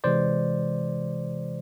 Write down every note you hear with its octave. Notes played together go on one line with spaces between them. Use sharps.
C3 E3 G#3 C5 D5